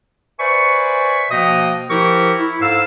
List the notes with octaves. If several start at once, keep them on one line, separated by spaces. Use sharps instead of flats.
B4 C5 D5 E5 G#5 C#6
B2 F3 A#3 D#5 G5 D#6
F3 E4 G4 A#4 G5 C#6
E4
G#2 A4 C5 F5 E6